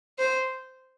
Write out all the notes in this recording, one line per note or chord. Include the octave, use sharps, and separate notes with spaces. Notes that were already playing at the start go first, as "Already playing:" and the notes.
C5